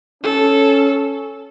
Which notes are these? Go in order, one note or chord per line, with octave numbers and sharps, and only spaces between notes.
C#4 A4